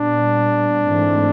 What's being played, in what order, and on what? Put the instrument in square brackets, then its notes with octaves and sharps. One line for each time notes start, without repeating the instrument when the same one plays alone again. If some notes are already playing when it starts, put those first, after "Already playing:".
Already playing: [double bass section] A#2 G3 B3 [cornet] D4
[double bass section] G#2 E3 A3 C4